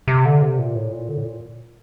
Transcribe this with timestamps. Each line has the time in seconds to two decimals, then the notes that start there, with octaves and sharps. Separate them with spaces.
0.08 C3
0.25 D3
0.42 C3
0.59 A#2
0.75 A2
0.92 A#2
1.09 D3
1.17 A2
1.25 A#2